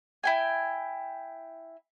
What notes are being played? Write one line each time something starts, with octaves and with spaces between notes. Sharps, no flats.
E4 G5 G#5